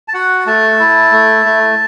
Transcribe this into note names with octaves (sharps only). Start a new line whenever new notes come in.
A5
F#4 F#5
A3 A5
E4
A3
A3